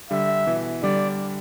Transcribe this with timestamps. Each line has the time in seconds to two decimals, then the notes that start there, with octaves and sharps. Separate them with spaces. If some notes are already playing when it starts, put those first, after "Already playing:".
0.11 D3 G3 E5
0.47 B2 E3
0.83 D3 G3 D5